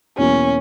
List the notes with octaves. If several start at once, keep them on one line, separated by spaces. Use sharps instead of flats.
E2 B2 F#3 A#3 C#4 E4